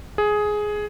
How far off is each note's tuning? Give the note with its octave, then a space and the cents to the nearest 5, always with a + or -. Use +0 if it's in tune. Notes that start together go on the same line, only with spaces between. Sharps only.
G#4 +10